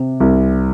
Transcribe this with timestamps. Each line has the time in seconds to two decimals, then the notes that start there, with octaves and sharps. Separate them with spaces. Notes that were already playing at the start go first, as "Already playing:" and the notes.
Already playing: C3
0.20 C2